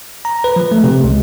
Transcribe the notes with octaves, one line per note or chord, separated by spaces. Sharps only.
A#5
B4
F3
A3
C3
C#2